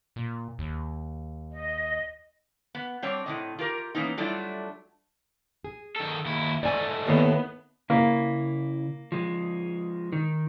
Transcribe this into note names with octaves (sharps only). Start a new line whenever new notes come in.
A#2
D#2
D#5
B3
G3 C4 D4 C#5
A2 C3 D#5
F4 G4 A#4
E3 A#3 B3 C#4 D#4
F#3 G3 A3 D4 E4 F4
G#4
D#3 A4
D#2 E4
G#2 A3 D5 G#5
D#2 A2 B3
C#3 A#3 E4
F3 G#3
D#3